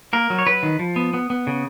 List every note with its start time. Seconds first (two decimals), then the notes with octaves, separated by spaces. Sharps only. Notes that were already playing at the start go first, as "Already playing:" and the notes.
0.13 A#3 A#4
0.30 F#3
0.38 C#5
0.47 F#3 B4
0.63 D#3
0.79 F3
0.96 B3
1.14 B3
1.30 B3
1.47 C#3